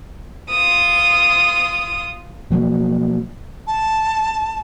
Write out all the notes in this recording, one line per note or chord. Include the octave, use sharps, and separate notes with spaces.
F4 D#6
B2 F3 F#3 A#3
A5